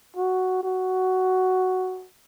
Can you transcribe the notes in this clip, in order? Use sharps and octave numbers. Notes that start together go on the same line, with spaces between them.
F#4
F#4